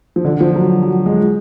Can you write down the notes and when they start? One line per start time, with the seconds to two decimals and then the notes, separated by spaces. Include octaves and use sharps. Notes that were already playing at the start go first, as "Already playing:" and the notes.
0.16 F3
0.25 D3
0.41 F3
0.56 F#3
0.83 F#3
1.06 G#3